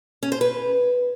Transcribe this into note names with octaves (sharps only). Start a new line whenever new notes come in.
C#4
C5
B4